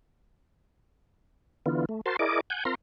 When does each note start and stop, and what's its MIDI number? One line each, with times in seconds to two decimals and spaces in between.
1.66 1.85 50
1.66 1.85 52
1.66 1.85 59
1.66 1.85 65
1.89 2.01 57
2.06 2.17 66
2.06 2.17 70
2.06 2.17 72
2.06 2.17 81
2.06 2.17 84
2.19 2.40 64
2.19 2.40 68
2.19 2.40 70
2.19 2.40 74
2.19 2.40 75
2.19 2.40 86
2.50 2.64 78
2.50 2.64 80
2.50 2.64 91
2.65 2.75 60
2.65 2.75 65
2.65 2.75 70
2.65 2.75 82
2.65 2.75 84